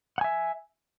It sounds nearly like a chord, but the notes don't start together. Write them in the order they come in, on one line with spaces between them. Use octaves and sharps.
F#5 G#5 E5